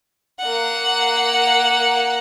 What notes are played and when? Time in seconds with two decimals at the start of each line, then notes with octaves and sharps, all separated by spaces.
0.40 A#3 F#5